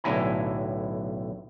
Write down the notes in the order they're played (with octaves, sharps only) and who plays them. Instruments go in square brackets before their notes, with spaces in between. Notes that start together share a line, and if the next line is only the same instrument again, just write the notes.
[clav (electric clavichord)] B1 A2 D3 E4 G#5 A#5